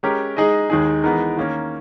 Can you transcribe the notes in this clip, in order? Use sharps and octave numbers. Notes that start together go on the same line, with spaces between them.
G#3 C#4 G4 A#4
G#3 D#4 G#4 D#5
D#2 D#3 G#3 D#4 G#4
E3 G#3 B3 D#4 A#4
D#3 A#3 C#4